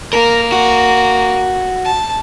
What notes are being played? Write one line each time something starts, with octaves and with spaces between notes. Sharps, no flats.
A#3 A#4
F#4
A5